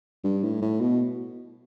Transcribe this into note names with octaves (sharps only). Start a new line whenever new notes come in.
G2
A2
A2
B2